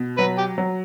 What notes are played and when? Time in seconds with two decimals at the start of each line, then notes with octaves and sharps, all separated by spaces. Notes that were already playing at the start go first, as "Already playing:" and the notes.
Already playing: B2
0.18 F#3 B4
0.38 G4
0.58 F#3